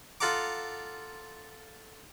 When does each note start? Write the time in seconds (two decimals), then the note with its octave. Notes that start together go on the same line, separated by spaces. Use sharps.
0.20 F4 A4 F#5 A#5 D6